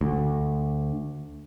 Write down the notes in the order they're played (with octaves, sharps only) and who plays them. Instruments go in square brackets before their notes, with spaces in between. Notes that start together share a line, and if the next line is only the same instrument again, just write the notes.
[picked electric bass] D2